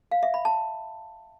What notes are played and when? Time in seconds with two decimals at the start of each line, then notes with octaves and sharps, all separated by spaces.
0.11 F5
0.23 E5
0.34 B5
0.45 A5